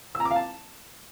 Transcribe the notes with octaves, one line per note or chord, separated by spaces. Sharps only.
E6
A#5
D6
F5
A5